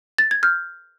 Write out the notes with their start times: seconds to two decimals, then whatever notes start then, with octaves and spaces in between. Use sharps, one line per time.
0.18 A6
0.31 G#6
0.43 F6 G6